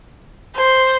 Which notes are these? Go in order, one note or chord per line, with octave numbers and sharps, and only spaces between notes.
C5